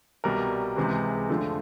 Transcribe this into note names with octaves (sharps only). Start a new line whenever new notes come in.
C2 B2 G3 A#4
C#2 C3 E3 G#3
F2 D3 F3 A3